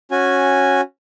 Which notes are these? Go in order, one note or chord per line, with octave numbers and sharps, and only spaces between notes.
C#4 F#4 G#5